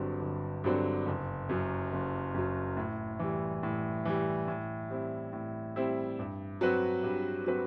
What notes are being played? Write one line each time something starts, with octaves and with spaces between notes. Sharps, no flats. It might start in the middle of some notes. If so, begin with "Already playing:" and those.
Already playing: G1 G2 D3 F#3 C4
G1
G2 D3 F#3 C4
F#1
F#2 F#3
F#1
F#2 F#3
A2
E3 G3
A2
E3 G3
A2
G3 C4 E4
A2
G3 C4 E4
G2
F#3 C4 F#4 B4
G2
F#3 C4 F#4 B4